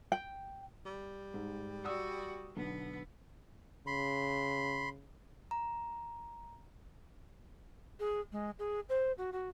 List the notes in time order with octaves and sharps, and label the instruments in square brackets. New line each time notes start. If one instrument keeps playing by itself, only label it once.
[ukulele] G5
[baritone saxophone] G3
[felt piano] G#2
[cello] F#4 [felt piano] D5 D#6 E6
[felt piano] B1 D3 [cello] B3
[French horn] C#3 [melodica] B5 C6
[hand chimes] A#5
[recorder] G#4
G#3
G#4
C5
F#4
F#4